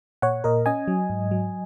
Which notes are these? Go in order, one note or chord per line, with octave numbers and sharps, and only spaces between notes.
A#2 C#5 F#5
A#2 A#4 D#5
C#4 D#5 G#5
F#3
G#2
F#3